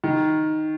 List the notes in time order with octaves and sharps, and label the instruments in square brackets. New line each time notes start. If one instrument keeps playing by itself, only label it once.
[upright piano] D#3